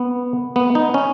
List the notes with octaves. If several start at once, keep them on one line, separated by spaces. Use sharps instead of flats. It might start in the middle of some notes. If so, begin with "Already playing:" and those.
Already playing: B3
B3
D#4
C#4